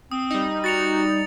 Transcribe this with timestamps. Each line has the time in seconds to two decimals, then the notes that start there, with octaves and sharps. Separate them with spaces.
0.11 C4 D#6
0.30 G3 D#4
0.64 F#4 A6 C#7 F7